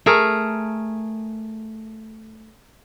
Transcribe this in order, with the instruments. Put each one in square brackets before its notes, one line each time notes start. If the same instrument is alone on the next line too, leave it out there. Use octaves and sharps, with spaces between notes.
[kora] A3 G#4 A#4